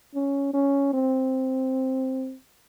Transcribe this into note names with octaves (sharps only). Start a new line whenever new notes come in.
C#4
C#4
C4